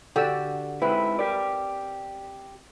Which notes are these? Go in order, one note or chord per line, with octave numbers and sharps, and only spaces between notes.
D3 F#4 G4 D5 E6
G#2 C4 E4 B4
G4 A#4 D5